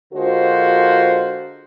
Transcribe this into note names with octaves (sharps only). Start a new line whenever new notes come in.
D3 G#3 F4 F#4 A#4 C5